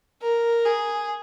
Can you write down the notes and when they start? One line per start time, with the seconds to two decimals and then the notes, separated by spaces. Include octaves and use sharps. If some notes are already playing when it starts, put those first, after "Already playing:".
0.22 A#4
0.65 G#4